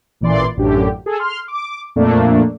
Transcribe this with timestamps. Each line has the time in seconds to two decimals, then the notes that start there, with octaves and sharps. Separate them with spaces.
0.21 A1 A#2 E3 D5 C6
0.57 A1 F#2 D3 G4
1.06 G#4 A4
1.19 C6 F6
1.48 D6
1.96 F2 A#2 A3 A#3 D4